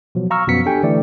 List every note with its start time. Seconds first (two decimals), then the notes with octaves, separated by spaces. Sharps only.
0.15 B2 F3 F#3
0.30 F5 A#5 C#6 E6 F6
0.48 F#2 B2 F3 B3 B6 C#7
0.66 D4 G4 A4 G5 G#5
0.83 D3 E3 A3 D5